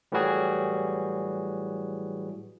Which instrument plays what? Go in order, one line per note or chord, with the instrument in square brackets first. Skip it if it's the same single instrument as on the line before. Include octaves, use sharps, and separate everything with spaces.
[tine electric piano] A2 E3 F#3 G3 F#4 G#4